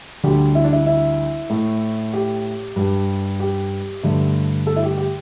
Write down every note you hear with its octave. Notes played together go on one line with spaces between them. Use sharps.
D2 D3 G3 G4
E4
D4
E4
E4
A2 A3
G4
G2 G3
G4
G2 D3 A3
A4
E4
G4
G4